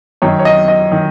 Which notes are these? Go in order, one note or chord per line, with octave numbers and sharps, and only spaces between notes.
F#2 D#3 C#5
C#5
D#5
D#5
D#3